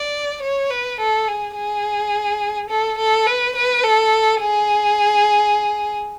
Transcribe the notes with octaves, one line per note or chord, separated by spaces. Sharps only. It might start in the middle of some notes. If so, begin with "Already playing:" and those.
Already playing: D5
C#5
B4
A4
G#4
G#4
A4
A4
B4
B4
A4
G#4